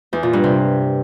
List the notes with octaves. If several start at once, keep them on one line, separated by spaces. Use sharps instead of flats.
E2
A#2
G2
C3